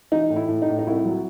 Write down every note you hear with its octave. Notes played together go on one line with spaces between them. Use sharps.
E3 D#4
A2
E4
A2
D#4
A2
D#4
C2 E4
F#3